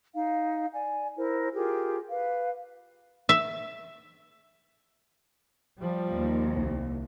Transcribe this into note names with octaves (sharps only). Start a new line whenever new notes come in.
D#4 F5
D5 G#5
E4 A#4 C5
F4 G4 G#4 A#4
B4 F5
E5
F3 G3
D#2
C2